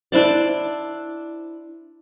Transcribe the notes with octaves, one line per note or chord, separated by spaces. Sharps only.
D4 E4 C5 D5